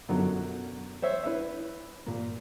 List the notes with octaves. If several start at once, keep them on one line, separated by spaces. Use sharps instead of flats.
F#2 B2 D3 F3 F#3
C5 C#5 E5
E4 B4 C#5 E5
A#2 A#3